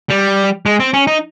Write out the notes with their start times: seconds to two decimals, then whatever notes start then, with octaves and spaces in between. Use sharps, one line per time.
0.10 G3
0.66 G#3
0.80 C4
0.94 C#4
1.07 D#4